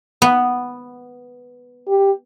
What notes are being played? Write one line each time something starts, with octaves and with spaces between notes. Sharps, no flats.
B3
G4